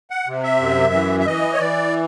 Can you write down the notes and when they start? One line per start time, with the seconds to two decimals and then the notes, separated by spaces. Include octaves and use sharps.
0.10 F#5
0.27 C3
0.44 E5
0.60 F#2
0.93 E3
1.20 E5
1.26 E3 D#5
1.54 C#5
1.59 E3 D5